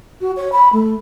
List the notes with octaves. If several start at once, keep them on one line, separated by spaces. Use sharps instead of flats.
F#4
C#5
B5
A3